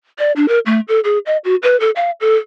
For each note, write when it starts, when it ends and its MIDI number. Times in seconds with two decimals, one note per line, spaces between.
0.19 0.32 74
0.36 0.46 62
0.48 0.59 70
0.66 0.80 57
0.88 1.00 69
1.04 1.19 68
1.26 1.37 75
1.45 1.56 66
1.63 1.79 71
1.80 1.90 69
1.96 2.11 77
2.21 2.36 69